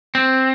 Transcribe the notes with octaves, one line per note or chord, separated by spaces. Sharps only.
C4